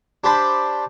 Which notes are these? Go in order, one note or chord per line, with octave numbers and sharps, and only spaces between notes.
D4 G4 C5 A5 B5